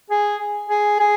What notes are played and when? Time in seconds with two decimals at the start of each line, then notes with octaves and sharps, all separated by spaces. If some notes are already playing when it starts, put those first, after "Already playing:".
0.10 G#4
0.70 G#4
0.99 G#4